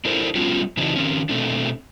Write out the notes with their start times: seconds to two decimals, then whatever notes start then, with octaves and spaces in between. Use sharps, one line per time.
0.05 D4 E4 A4 A#4 C5
0.35 G3 B3 C#4 F4 F#4
0.77 C#3 E3 C4 D4 D#4 F#4
0.96 D#3 C4 C#4
1.29 B2 A3 C4 D4